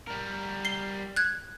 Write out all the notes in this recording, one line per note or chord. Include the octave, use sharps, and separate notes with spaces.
G3 A#4
C7 G7
F#6 G#6